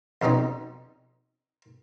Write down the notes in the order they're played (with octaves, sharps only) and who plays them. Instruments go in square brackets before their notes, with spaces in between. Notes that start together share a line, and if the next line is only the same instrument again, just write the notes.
[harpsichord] F2 B2 F#3 C#4 D#4